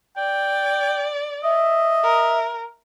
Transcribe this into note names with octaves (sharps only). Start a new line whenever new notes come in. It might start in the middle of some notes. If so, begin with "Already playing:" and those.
D5 G5
D#5 E5
A#4